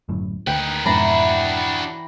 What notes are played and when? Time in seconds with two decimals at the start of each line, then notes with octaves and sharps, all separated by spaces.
0.09 G1 F#2 A2
0.47 D2 D#3 B4 G5
0.86 F2 G#2 B2 E3 D4 F#4 A#5 B5